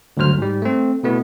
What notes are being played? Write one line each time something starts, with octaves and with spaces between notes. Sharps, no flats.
D2 G2 D3 F#3 C5 F6
G#2 G3
A3 C4
B2 A3 B3 E4